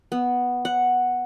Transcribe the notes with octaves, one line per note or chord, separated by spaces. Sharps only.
B3
F#5